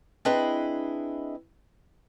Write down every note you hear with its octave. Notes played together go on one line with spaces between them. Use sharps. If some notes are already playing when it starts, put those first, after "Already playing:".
C4 D4 E4 G#4 B4 D#5